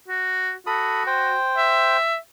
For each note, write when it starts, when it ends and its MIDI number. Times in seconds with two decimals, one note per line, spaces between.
0.08 0.53 66
0.67 1.36 66
0.67 1.03 69
0.67 1.03 83
0.67 1.03 87
1.07 1.97 72
1.07 1.97 79
1.57 2.17 76